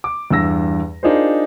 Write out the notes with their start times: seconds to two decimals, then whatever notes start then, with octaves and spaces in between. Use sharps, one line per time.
0.04 D6
0.31 E2 G2 E6 A#6
1.03 D4 D#4 F4 G#4 A#4 C5